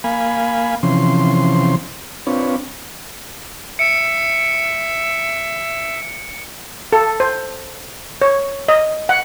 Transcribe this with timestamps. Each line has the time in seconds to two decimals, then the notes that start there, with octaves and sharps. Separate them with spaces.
0.04 A#3 F5 G#5 B5
0.83 C3 E3 F3 C#4 C6
2.27 C4 D4 F4 B4 C#5
3.79 E5 C#7 D7
6.93 A4
7.20 C5
8.22 C#5
8.68 D#5
9.09 F#5